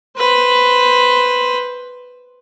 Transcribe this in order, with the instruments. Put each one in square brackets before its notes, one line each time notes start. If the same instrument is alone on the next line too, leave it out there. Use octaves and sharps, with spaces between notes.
[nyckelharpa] B4 C5